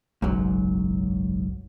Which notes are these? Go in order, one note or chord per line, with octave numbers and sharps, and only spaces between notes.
F#1 B1 G#2 F#3